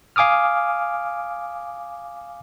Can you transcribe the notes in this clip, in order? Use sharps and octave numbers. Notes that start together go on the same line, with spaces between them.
F5 G#5 D6 D#6 F6